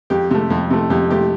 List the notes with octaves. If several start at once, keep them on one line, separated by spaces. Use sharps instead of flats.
F2 G4
C3 A3
F2
C3 A3
F2 G4
C3 A3 G4